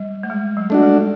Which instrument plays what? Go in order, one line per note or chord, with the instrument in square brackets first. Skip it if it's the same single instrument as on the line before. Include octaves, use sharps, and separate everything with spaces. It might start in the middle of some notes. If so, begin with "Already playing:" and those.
Already playing: [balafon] G3
A3
G#3
F#3
[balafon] G3 [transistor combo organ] A3 D4 F#4
[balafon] G#3